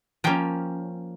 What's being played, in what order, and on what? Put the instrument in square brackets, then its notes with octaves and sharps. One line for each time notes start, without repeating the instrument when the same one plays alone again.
[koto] F3 A#3 C#4 G5